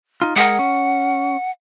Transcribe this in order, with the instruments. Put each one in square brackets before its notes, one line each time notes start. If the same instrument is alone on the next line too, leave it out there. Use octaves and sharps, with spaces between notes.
[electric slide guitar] D#4 F4
[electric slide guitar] G#3 G#4 A#4 [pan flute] F#5
[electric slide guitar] C#4